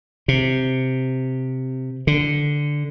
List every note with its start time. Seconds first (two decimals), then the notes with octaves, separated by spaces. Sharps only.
0.28 C3
2.07 D3